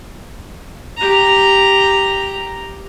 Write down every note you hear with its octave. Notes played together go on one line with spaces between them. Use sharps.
G4 A#5